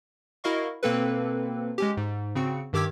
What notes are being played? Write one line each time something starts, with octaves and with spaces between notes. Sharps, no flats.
E4 F#4 A#4 D#5 F5 C#6
B2 A#3 C4 A4 B4
G#3 C#4 G4
G#2
C#3 C4 F#4 C#7
G2 D#3 G4 D6 E6 G#6